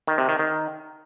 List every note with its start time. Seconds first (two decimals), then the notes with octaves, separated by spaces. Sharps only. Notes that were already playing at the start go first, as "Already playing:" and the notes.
0.08 D#3
0.18 C3
0.29 D#3
0.39 D#3